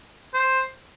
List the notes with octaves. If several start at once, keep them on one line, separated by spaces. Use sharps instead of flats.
C5